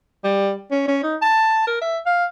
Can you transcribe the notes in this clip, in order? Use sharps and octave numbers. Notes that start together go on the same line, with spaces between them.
G3
C#4
C#4
D#4
A5
A#4
E5
F5